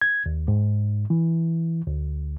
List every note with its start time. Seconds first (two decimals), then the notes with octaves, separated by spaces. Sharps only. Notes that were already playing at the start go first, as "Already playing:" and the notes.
0.01 G#6
0.26 D#2
0.48 G#2
1.10 E3
1.87 D2